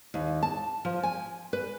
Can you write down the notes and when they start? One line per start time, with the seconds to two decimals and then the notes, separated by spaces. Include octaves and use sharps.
0.14 D#2
0.43 A5
0.85 F3
1.03 G#5
1.53 B4